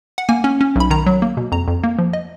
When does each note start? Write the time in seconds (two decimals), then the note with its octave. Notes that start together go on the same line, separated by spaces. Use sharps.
0.18 F#5
0.29 A#3 G#5
0.44 C#4
0.61 C#4
0.76 B1 B5
0.90 D#3 A#5
1.06 F#3
1.22 A#3
1.37 B2
1.52 F2 A#5
1.68 F2
1.84 A#3
1.99 F3
2.13 D#5